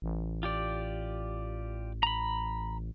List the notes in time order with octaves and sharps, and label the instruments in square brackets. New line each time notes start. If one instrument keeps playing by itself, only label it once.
[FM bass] A1
[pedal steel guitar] F4 G4 D5
A#5 B5